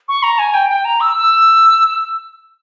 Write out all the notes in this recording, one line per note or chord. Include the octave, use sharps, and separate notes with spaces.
C#6
A#5
G#5
G5
G5
A#5
E6
E6